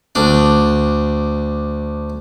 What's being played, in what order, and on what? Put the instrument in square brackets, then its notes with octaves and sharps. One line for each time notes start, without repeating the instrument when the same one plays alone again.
[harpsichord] D2 D4